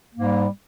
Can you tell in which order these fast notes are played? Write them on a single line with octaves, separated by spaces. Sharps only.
A#3 G#2 G3